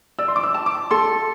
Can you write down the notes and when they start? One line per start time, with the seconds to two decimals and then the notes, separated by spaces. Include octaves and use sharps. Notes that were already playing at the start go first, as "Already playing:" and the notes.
0.19 D5 E6
0.28 C6
0.36 D6
0.43 E6
0.54 A5
0.66 D6
0.91 A4 C6